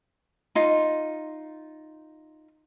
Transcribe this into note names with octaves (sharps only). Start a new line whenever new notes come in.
D#4 F4